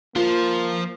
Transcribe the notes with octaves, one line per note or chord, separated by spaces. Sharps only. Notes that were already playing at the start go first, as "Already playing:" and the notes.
F3 A#3 F4 C5